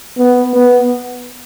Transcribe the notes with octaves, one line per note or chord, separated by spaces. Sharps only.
B3
B3